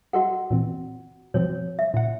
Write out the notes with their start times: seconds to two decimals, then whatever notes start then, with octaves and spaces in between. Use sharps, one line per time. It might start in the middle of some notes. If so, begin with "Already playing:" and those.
0.13 F#4 G#4 A4 D#5 F#5
0.51 A#2 E3 C4
1.34 B2 F3 C4 C#5
1.79 E5
1.94 A#2 F#5